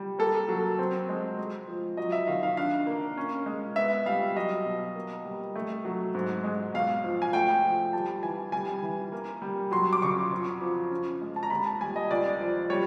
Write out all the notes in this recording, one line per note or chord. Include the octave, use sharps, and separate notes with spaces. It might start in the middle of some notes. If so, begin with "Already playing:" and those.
Already playing: G3
A#3 A4
F#3
C4
G#3
G#3
F3
F#3 D#5
E5
D#3 F5
F5
D4 F5
A#3
C#4
G#3
B3 E5
G3 F5
F#3 D#5
B2
A#3
G3
A3
F#3
G#2
G#3
B1 F5
F3
G#5
A3 G5
F3
G3 A5
E3 G#5
G3 G#5
E3
A#3
G3
F#3 C6
D6
C#3 C#6
F2
F3
C#4
G#3
A5
A#5
D#2 B5
A5
G3 G#5
D#5
C#2 D5
F3
G3 C#5